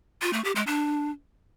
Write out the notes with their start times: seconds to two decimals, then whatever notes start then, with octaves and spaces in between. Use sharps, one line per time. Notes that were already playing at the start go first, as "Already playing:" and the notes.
0.22 F4
0.33 A3
0.44 G4
0.55 G#3
0.67 D4